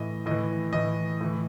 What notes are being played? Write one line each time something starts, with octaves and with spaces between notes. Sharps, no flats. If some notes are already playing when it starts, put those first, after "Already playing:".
Already playing: A2 E3 D#5
A2 E3 D#5
A2 E3 D#5
A2 E3